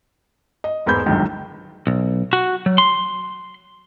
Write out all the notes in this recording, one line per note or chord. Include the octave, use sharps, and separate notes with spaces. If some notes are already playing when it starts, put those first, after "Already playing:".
D#5
E1 G#2 G#3 B3 B5 G6
G1 C#2 F#2 D3 D#3
B1
F#4
F#3
C6